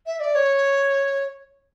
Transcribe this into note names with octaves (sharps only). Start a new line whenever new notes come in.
E5
D5
C#5